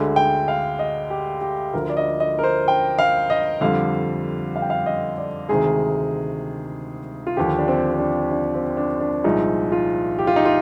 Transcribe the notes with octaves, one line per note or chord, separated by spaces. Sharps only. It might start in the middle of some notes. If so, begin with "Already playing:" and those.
Already playing: D2 D3 G#3
G5
F5
D#5
G4
G4
D2 D3 F3 A#4
D5
D#5
D#5
A#4
C5
G5
F5
D#5
F2 D3 G3 F5
F5
G5
F5
D#5
D5
D2 C3 D#3 G#3 G#4
F4
D#2 D3 F3 G4
D4
C4
C4
D4
D4
C4
D4
D4
C2 A#2 F3 G#3 D#4
F4
G4
F4
D#4
F4